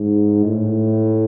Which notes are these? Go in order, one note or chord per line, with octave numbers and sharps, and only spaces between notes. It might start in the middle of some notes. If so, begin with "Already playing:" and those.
Already playing: G#2
A2